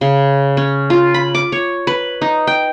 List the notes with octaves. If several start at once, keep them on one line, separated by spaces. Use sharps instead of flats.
C#3
C#4
F4
B5
D6
C#5
B4
D#4
G5